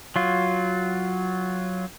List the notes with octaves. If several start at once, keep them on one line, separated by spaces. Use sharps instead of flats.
F#3 F4